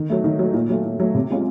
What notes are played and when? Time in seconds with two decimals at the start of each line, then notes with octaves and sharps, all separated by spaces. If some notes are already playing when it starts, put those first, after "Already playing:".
Already playing: D#3
0.10 F#3 A3
0.24 D#3
0.39 F#3 A3
0.54 A#2
0.69 F#3 A3
0.85 A#2
1.00 F#3 A3
1.15 C3
1.30 F3 G#3 C#4 F4